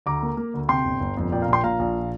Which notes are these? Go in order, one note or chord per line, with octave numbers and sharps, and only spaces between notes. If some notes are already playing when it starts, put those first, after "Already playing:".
D2 A#5 D6
A#3
A#3
D2
C3 G5 C6
G1
G1
F2
A#2 D5 G5
F5 A#5
A#1 G5 C6
A#2 F5 A#5
A#1